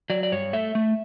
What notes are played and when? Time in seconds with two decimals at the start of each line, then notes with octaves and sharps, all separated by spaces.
0.10 F#3 D5
0.23 D5
0.32 G2 C#5
0.53 A3 E5
0.75 A3